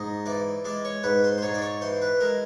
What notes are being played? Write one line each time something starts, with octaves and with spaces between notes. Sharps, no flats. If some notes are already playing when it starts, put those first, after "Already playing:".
Already playing: G#2 D#5
E3 D5
G#3 D5
C#5
G#2 B4
C5
C5
G#2 C#5
D5
C#5
E3 C5
B4
G#3 A#4